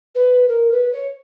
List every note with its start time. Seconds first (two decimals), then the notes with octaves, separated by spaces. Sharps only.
0.14 B4
0.48 A#4
0.71 B4
0.92 C#5